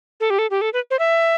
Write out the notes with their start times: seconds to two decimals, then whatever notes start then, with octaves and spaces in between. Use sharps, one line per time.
0.20 A4
0.30 G4
0.39 A4
0.51 G4
0.61 A4
0.73 B4
0.91 C5
0.99 E5